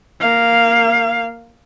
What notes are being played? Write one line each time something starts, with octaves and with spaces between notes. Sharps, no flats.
A#3 F5